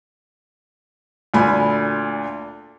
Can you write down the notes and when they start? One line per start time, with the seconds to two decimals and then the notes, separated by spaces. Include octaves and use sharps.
1.34 D2 A#2 G#5 B5